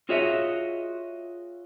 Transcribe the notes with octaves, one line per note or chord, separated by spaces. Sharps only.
F4 F#4 G#4 C#5 D#5 E5